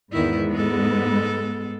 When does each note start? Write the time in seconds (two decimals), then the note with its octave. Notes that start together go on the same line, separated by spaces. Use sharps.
0.12 E2 G#2 D#3 B3 E4
0.52 G#3 A4